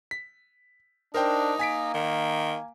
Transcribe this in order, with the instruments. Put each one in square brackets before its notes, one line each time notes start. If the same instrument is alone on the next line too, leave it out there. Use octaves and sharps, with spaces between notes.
[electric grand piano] B6
[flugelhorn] D4 [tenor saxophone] D#4 [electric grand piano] A#4 C5 G5
[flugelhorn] A#3 [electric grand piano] G#5 B6 D7
[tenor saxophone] D#3